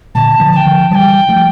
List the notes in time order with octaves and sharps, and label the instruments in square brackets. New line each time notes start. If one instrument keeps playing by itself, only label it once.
[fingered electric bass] A#2 D3 [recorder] A5
[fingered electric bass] D3 F3
[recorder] A5
G5
[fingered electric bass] D3 F3
[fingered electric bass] E3 G3 [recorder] G5 A5
[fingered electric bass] F3 A3